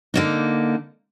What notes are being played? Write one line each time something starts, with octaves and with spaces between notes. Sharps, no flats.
D3 A#3 D#4